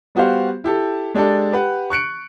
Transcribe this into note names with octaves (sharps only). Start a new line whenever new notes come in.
G3 B3 F#4 G4 C5 F5
E4 G4 A4
G#3 D4 G4 A4 D5
G4 B4 F#5
C#6 F#6 C#7 D7